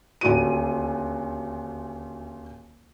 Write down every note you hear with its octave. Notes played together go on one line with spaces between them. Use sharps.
D#1 D2 F#4 D#7